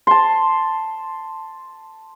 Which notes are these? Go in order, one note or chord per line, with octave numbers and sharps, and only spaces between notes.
A5 C6